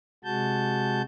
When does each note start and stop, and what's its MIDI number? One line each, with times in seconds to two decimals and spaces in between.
0.24 1.02 48
0.24 1.02 56
0.24 1.02 66
0.24 1.02 81
0.24 1.02 91